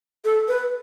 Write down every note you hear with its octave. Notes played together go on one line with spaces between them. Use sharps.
A4
B4